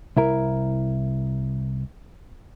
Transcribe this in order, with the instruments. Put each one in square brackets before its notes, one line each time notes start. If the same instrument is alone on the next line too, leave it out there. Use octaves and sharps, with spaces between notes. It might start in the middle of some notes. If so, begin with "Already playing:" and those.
[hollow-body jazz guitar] C2 E4 A#4